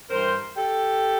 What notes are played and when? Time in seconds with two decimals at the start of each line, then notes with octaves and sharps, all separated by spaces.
0.09 G2 E3 G3 A#4 C5
0.55 G4 A4